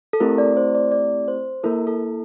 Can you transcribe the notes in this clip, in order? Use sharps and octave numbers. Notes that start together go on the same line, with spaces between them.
A4
A3 C4 E4 G4 A#4
D5
C5
D5
D5
C5
A#3 E4 A4 A#4
A4